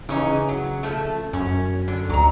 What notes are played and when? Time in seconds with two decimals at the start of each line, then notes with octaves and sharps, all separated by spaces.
0.09 C#3 E3 C#4 D#4
0.49 F#3
0.83 F3 A3
1.33 F#2 C#4
1.88 D3
2.10 D2 F#3 A#5